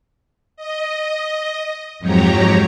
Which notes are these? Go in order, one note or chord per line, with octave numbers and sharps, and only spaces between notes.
D#5
F2 G#2 F#3 G4 C#5 A#5